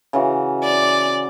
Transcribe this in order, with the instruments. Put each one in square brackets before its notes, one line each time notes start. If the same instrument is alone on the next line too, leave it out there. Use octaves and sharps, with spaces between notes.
[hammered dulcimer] C#3 E3 F#4
[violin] D5